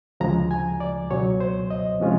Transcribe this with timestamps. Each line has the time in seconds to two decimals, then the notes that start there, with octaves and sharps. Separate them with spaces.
0.20 D2 C#3 F3 G#3 A#5
0.51 G#5
0.80 D5
1.11 C#2 B2 F#3 C#5
1.40 C5
1.70 D#5
2.00 C3 F3 G#3 C#4 F4